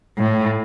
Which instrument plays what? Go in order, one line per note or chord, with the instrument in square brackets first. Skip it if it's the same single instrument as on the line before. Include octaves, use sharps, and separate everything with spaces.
[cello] A2